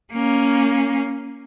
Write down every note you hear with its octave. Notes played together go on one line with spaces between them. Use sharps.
A#3 C#4